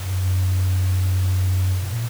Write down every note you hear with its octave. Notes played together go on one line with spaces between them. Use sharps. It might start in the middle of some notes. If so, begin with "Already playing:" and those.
Already playing: F#2
A#2